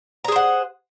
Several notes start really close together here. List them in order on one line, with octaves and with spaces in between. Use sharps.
A#5 G#4 C5 F#5